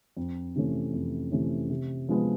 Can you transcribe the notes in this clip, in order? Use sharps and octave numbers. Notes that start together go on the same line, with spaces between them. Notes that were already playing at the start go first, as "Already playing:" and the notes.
F2
C3 E3 A3 C#4
F2
C3 E3 A3 C#4
C3
F3 G#3 B3